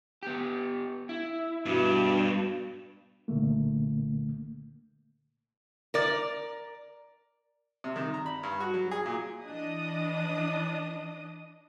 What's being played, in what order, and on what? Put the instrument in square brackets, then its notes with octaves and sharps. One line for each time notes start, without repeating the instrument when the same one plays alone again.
[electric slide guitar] B3 G4
E4
[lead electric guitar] G2 [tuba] B2
[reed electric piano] C2 A#2 D3 A3 A#3
[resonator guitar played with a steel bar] A#4 D5
[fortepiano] C3
D#3
A#5
B5
G2
F#4
F#3
G#4
A#2
[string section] E3 D4 D#5 D#6